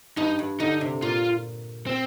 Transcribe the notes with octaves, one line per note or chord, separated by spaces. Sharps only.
G2 D#4
G2
D3 D#4
C3
A#2 F4
C4